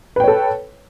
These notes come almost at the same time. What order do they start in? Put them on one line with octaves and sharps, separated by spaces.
B4 G5 C#5 A4